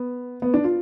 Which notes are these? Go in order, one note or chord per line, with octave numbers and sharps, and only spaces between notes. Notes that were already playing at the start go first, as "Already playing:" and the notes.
Already playing: B3
B3
D4
F4